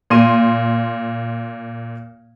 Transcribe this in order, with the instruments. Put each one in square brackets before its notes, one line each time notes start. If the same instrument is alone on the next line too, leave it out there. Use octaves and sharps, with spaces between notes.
[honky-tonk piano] A#2 C6 D#7